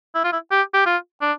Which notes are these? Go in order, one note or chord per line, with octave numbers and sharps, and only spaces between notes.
E4
F4
E4
G4
G4
F4
D4